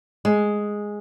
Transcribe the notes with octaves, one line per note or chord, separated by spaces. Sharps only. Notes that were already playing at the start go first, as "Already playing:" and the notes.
G#3